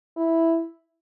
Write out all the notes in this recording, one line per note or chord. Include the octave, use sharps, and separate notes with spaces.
E4